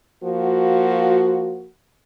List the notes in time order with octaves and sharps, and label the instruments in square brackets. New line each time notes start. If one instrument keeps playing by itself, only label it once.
[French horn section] F3 A#3 F#4